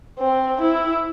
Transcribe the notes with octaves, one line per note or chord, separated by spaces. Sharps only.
C4
E4